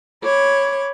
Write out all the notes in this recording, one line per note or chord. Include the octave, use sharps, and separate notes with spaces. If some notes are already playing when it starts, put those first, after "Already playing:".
C#5 B5 D6